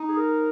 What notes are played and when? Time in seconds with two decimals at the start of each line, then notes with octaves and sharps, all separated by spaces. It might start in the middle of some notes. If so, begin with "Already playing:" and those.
Already playing: D#4
0.09 G#4
0.17 A#4